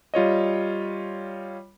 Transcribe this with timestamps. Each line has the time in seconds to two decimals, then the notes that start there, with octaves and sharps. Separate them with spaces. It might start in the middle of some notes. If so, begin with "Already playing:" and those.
0.14 G3 F4 C#5 D#5